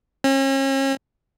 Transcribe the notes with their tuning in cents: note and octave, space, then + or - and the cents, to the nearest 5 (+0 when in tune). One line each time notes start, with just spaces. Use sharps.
C#4 -40